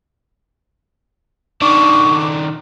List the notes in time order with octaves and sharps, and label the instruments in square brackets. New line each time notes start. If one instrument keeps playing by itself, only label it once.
[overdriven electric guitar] D#3 D4 [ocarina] C#6 [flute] D6